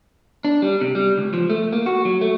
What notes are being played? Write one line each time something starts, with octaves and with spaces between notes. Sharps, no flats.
D4
G3
C3
G3
C#2
F3
A3
A#3
F#4
F#3
A3